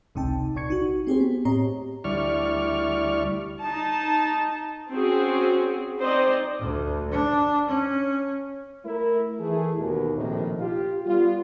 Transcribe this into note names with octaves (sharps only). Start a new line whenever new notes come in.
G#1 C#2 C3 D#4 G5 A5
A#1 D5 C#6 G#6 C#7
D#4 F#4
C4 G4 G#4 C5
B3
A2 C4 G4 C#5 D#5 A#5
D2 G3 E4 D5 C#6 F6
D#4 A5
C4 C#4 F#4 G#4
C4 D#4 C5 D5 D#5
D2
D4
C#4
A3 E4 A#4
E3 A3 E4 G#4
D#2 B2
A#1 A2 C3 D#3
F4 G4
G3 B3 F4